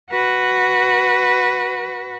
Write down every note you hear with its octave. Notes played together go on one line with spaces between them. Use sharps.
F#4 B4